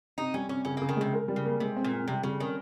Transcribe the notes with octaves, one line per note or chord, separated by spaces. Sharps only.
C3 D#4
G3 C#4
C3 C#4
C#3 C#4
C#3 A#3
D#3
C3 G#3
A#4
G3
C#3
A#3
C3 G#3
C4
A#2
C4
C3 G3
C#3 G3
D#3 C#4